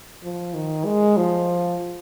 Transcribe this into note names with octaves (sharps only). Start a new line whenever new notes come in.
F3
D#3
G#3
F3